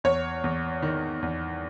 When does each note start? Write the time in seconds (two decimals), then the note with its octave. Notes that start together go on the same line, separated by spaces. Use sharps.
0.04 E2 C#5
0.44 E2
0.82 D#3
1.22 E2